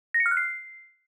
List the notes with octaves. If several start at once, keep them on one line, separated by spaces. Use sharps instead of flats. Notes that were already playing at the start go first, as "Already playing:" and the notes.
A#6
C#7
F6
F#6
C7